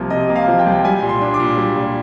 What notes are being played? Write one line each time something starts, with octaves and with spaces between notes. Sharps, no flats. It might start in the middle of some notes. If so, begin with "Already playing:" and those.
Already playing: C2 C3 F3 A#3
C3 D#5
A#3
F5
F3
G5
C2
G3 G#5
A#2
C6
D4
D6
A#2
G3
A#2